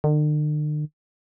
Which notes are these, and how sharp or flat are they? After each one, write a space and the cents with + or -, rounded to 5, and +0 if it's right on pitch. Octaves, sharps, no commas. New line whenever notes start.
D3 +45